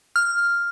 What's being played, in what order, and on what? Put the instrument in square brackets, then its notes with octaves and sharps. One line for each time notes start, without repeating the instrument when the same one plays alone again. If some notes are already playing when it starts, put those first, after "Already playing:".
[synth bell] F6